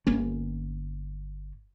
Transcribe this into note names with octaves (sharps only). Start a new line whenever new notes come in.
G1 A#3 C#4